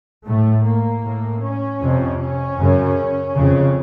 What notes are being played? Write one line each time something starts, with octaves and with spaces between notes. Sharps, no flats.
A2 A3
A#3
A2
C#4
F2 C3
C#4
F#2 C#3
F2 C#3